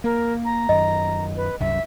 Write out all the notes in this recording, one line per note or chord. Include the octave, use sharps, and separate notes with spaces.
A#3 A#4
A#5
F#2 D#3 D#5
B4
C2 F#2 E5